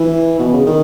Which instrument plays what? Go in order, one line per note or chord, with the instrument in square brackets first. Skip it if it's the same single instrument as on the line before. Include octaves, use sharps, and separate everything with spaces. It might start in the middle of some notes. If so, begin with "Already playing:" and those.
Already playing: [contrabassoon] E3
B2
C#3
D#3